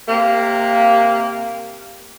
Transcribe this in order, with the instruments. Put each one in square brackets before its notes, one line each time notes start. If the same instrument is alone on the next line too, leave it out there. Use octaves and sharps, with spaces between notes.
[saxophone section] C3 A#3